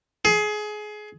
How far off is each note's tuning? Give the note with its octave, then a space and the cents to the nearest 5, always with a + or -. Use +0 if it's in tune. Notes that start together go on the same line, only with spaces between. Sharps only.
G#4 +25